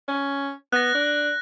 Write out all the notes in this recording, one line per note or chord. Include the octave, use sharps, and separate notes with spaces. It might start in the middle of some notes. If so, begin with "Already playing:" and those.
C#4
B3 F#6 A#6
D4